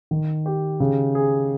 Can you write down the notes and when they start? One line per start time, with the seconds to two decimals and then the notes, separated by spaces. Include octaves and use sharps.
0.11 D#3
0.46 G4
0.80 C#3
1.15 G#4